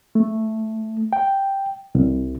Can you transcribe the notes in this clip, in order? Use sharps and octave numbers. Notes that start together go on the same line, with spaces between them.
A3
G5
C2